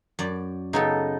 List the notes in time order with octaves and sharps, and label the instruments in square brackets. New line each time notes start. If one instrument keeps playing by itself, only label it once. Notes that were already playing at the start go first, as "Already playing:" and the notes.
[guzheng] F#2 D5
[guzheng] C#3 B3 A4 [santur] D#4